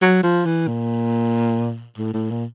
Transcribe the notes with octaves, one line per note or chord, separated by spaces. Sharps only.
F#3
F3
E3
A#2
A2
A2
A#2